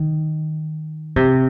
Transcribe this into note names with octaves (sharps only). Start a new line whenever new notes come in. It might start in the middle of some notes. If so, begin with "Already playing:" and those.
Already playing: D#3
C3